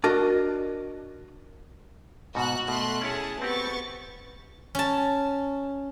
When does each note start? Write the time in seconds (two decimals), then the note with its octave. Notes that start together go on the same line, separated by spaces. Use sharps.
0.04 D4 F#4 A#4 D5 D#5
2.35 G#2 B2 F#4 F#6
2.68 B2 A3 C6 F#6
3.02 C#4 E4 G#4 C#5 A5
3.42 B3 C4 F#4 G4 C#6 A6
4.75 C#4 A5